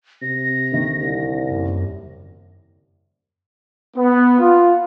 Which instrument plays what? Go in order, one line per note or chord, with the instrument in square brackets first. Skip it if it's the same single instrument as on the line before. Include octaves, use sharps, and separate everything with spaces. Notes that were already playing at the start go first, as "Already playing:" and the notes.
[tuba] C3 [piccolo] A#6
[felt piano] D2 D#3
[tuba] C2
[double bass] F#1 F#2
[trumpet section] B3
F4